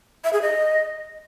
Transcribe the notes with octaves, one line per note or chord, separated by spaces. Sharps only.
E5
G#4
D#5